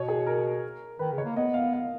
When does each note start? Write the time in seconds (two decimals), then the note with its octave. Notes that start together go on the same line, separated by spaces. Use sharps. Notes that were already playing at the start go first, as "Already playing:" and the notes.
Already playing: B2 C#5
0.08 G#4
0.27 A#4
0.99 D#3 B4
1.12 C#3
1.18 C#5
1.24 A#3
1.36 B3 D#5
1.54 F5
1.73 F5